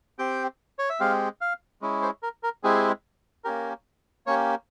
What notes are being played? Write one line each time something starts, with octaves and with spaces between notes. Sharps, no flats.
C4 G4 G5
C#5
E5
G#3 C4 G4 F5
F5
G#3 C#4 E4
C5
A#4
A#4
G#3 C4 E4 G4 G#4
A#3 C#4 G4 A#4
A#3 C#4 G4 C#5